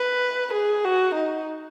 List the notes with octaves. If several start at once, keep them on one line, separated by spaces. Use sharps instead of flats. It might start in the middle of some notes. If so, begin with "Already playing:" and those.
Already playing: B4
G#4
F#4
D#4